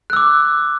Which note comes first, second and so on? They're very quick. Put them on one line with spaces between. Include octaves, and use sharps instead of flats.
F#6 E6 D6